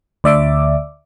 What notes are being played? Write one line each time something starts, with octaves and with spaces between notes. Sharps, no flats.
D2 D5 E5 D6